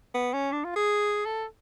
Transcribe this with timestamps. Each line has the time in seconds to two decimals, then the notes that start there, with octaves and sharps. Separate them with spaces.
0.14 B3
0.33 C#4
0.52 D4
0.65 F4
0.76 G#4
1.25 A4